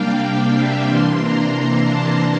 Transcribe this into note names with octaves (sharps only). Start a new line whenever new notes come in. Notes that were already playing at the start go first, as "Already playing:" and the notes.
Already playing: C3 G3 A#3 D4 F5 G5
F5
E5
C3 E3 A#3 D4 C6
A#5
A#5
A5